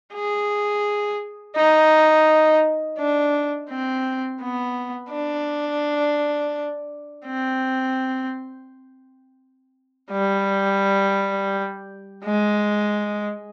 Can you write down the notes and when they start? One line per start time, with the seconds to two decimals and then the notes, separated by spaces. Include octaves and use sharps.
0.14 G#4
1.56 D#4
2.98 D4
3.70 C4
4.42 B3
5.12 D4
7.26 C4
10.11 G3
12.24 G#3